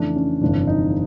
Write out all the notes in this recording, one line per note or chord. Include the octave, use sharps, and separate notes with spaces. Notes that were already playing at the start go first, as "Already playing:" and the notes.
Already playing: F2 C#3 E3 A3 D4
C#4
G1 F2 C3 E3 D4
D#4